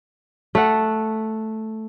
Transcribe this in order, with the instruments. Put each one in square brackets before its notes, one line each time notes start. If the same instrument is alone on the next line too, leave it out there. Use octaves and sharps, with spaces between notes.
[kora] A3 F#5